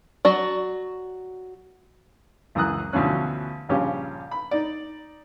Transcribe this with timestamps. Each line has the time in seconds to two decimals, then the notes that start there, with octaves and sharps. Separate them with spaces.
0.25 F#3 F#4 D5
2.55 C#2 F#2 E3 A#5 D#6 F#6
2.93 D2 B2 E3 F3 C#4 F#6
3.69 A#1 G2 C#3 F3 C#4 G4
4.31 B5
4.51 D#4 D5